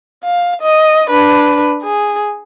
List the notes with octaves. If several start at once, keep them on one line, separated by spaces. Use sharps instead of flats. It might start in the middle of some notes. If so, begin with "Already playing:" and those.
F5
D#5
D4 B4
G#4